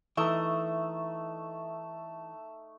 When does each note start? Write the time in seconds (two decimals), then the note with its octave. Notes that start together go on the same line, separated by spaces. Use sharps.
0.17 E3 A3 D#4 E5 C#6 D#6